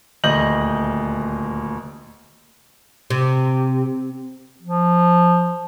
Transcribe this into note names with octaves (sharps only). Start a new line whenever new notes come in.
D#1 D2 D#5 G6 F#7
C3
F3